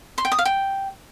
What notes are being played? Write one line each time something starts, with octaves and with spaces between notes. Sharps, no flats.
C6
G5
D#6
F5
G5